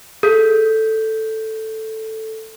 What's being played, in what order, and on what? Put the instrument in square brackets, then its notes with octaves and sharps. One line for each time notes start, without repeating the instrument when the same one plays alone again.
[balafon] G#4 [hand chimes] A4 G6 B6